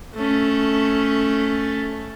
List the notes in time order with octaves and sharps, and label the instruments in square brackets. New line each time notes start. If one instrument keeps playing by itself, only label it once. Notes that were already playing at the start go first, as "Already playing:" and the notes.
[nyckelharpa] A3 C#4